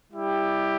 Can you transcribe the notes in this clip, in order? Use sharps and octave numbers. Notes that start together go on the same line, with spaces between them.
G3 E4 G4